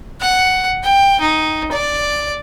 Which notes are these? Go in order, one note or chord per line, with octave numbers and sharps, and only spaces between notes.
F#5
G5
D#4
D5